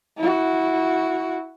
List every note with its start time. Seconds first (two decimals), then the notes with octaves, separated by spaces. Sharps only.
0.18 E4 F#4